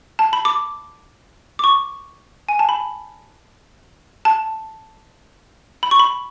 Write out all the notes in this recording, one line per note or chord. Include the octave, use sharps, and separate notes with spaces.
A5
B5
D6
D6
C#6
G#5
A5
B5
A5
B5
C#6
B5